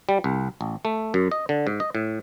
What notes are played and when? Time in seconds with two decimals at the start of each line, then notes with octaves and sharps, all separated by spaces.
0.09 G3
0.24 C2
0.61 A1
0.85 A3
1.14 F#2
1.31 D#5
1.49 D3
1.67 G#2
1.80 D#5
1.95 A2